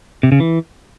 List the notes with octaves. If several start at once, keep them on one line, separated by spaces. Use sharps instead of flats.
C3
C#3
E3